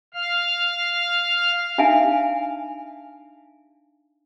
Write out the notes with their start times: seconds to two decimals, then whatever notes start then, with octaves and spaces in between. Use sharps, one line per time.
0.14 F5 F6
1.78 D4 D#4 E5 F5 G#5 A5